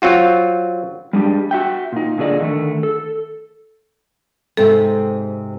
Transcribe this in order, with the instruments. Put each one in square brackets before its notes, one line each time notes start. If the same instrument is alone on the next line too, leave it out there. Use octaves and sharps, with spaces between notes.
[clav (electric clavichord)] F#3 C4 F4 F#4
[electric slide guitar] G3 G#3 D4 G4
F#4 E5 G5
A#2 D#4
A#2 D3 G#4 D5 D#5
D3 D#3 A3
A4
[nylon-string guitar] G#2 C3 C4 [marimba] A4